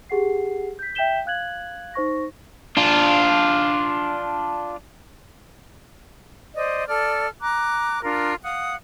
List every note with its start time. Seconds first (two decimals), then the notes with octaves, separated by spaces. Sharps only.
0.09 G4 G#4 F#5 C7
0.79 G6 B6
0.95 E5 G5 G6 B6 E7 G7
1.26 F5 F#6 G#6 F#7
1.94 D#4 C5 C#6 A#6
2.77 D4 F4
6.54 C5 D5 D#5
6.88 A4 D5 F6
7.41 A#5 D6 F#6
8.03 D4 F4 A#4
8.43 F5 F#5 D#6